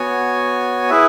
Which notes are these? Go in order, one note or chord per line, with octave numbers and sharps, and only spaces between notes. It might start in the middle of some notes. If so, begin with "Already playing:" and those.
Already playing: B3 F#4 C#5 G#5
E4 G#4 B4 E5